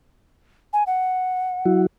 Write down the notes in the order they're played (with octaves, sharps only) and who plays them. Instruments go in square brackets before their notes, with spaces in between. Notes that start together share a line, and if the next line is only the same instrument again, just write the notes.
[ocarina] G#5
F#5
[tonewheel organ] F#3 E4 F#4